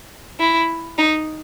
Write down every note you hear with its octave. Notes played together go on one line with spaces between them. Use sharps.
E4
D#4